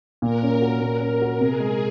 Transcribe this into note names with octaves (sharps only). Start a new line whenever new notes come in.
A#2 A#4
C#4
F#4
A#2
C#4
F#4
C3 G#4
G#3